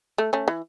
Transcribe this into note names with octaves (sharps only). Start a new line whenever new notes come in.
A3
A3 C#4
E3